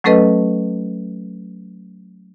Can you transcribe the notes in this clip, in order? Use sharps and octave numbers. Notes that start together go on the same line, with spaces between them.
F#3 A3 C#4 A4 B4 D#5